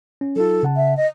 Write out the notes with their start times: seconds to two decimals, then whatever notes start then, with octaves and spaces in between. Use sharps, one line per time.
0.21 C#4
0.36 F#3 D#4 F4 A4
0.63 C#3 F#5 A5
0.76 E5
0.97 D#5